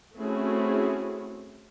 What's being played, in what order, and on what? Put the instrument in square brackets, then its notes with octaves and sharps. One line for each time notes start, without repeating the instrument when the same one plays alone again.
[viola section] A3 C4 C#4 E4 F#4 G#4